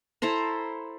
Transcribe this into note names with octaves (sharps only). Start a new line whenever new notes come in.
E4 A4 C5 A#5